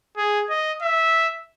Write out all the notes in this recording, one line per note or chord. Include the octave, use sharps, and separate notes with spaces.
G#4
D#5
E5